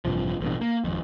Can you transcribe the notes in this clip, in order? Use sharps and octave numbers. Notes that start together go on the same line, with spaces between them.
A1 G2 C3 F3
A1 G2 B2
A#3
G#1 F2